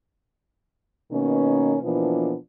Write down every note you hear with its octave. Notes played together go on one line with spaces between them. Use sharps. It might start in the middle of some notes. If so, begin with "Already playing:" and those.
B2 D#3 A#3 B3 C#4
B2 E3 F3 A#3 B3 D4